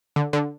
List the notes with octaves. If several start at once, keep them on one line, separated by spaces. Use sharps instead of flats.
D3
D3